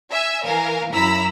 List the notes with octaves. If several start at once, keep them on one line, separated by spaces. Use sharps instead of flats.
E5 G#5 E6
E3 A#4 F5 G#5
F#2 E4 A#5 B5 E6 B6